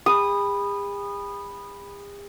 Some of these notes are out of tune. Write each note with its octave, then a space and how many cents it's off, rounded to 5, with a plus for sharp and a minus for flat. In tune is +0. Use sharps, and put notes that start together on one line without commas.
G#4 -45 B5 +0 D#6 -20